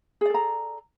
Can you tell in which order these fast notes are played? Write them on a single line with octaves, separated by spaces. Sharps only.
G#4 D5 A4 A#5